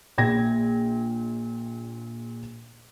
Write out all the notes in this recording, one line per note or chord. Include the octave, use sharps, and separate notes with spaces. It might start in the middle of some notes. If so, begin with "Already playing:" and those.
A#1 A#2 G5 G#6 A#6